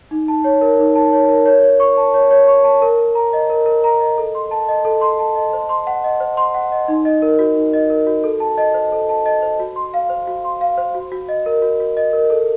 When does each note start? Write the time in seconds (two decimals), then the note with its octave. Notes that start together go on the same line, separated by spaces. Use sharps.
0.11 D#4
0.28 A5
0.44 C#5
0.61 A#4
0.79 D#4
0.95 A5
1.13 C#5
1.29 A#4
1.46 C#5
1.63 C#5
1.80 C#6
1.97 A5
2.14 C#5
2.31 C#5
2.47 C#6
2.64 A5
2.82 A#4
2.99 A#4
3.15 A#5
3.33 D#5
3.50 A#4
3.66 A#4
3.84 A#5
4.00 D#5
4.18 A4
4.35 C6
4.51 A5
4.69 D#5
4.85 A4
5.01 C6
5.19 A5
5.36 D#5
5.53 C5
5.69 C6
5.87 F#5
6.04 D#5
6.20 C5
6.37 C6
6.54 F#5
6.72 D#5
6.88 D#4
7.05 D#5
7.22 A#4
7.39 F#4
7.56 D#4
7.73 D#5
7.90 A#4
8.07 F#4
8.24 A4
8.40 A5
8.58 D#5
8.74 C5
8.92 A4
9.09 A5
9.26 D#5
9.42 C5
9.60 F#4
9.76 C6
9.94 F5
10.10 C5
10.28 F#4
10.45 C6
10.61 F5
10.78 C5
10.95 F#4
11.12 F#4
11.29 D#5
11.46 A#4
11.62 F#4
11.80 F#4
11.97 D#5
12.13 A#4
12.30 A4